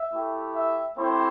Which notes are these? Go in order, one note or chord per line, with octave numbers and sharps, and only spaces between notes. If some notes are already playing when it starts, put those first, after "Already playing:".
Already playing: E5
A3 E4 G4
E5
A3 C4 E4 G4 C5